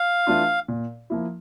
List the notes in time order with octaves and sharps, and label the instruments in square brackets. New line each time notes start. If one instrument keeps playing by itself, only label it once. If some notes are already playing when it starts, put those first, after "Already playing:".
Already playing: [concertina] F5
[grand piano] E3 A3 D4 F4
A#2
F3 A#3 E4